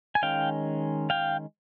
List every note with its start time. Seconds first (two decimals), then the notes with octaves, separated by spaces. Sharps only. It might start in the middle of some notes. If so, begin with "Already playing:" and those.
0.15 G#5
0.22 D#3 G#3 C#4 F5 G5
1.10 F5 G5